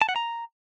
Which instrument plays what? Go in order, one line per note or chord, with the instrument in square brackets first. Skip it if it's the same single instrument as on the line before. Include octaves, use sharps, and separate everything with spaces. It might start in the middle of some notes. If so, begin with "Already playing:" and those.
[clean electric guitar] A5
F#5
A#5